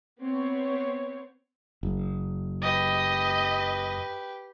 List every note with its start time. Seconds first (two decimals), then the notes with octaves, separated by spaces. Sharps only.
0.20 B3 C4 C#5
1.83 F#1
2.62 G4 B4 D#5